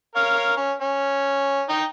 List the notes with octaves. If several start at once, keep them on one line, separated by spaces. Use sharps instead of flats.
A#4 C#5 F5
C#4
C#4
D#4 D#5 G5